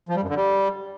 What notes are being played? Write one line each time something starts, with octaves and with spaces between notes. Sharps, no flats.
F3
G3
F#2
D3
G3